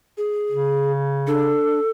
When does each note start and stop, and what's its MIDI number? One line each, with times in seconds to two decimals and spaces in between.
0.17 0.92 68
0.51 1.55 49
1.27 1.79 62
1.27 1.90 69